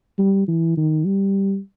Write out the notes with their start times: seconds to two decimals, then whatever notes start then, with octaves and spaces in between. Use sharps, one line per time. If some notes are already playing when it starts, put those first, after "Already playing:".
0.18 G3
0.48 E3
0.77 D#3
1.06 G3